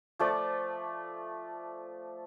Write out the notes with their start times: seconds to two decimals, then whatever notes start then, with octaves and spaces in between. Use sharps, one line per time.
0.19 F3 A3 D5